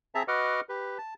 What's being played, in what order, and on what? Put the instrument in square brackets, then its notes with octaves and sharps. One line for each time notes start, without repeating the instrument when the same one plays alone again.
[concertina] C4 G#4 E5 A5 A#5
F#4 B4 D#5 F#5 D6 F6
G4 B4
A5